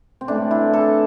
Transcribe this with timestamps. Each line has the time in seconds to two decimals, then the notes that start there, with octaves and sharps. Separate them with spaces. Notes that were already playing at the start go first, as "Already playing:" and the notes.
0.21 C4
0.28 A2 E3 A3 D4
0.51 E4
0.73 A4